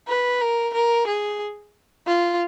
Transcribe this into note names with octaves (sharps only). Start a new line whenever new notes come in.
B4
A#4
A#4
G#4
F4